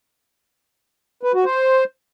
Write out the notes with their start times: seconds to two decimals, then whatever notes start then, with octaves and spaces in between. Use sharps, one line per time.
1.23 B4
1.34 F#4
1.45 C5